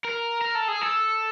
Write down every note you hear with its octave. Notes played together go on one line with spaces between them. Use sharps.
A#4
A#4
A4
G#4
A4